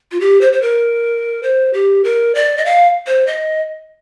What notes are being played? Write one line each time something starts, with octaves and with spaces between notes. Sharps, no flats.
F4
G4
C5
C5
A#4
C5
G4
A#4
D5
D#5
F5
C5
D#5